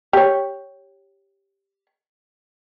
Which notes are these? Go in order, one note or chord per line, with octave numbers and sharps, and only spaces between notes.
G4 C#5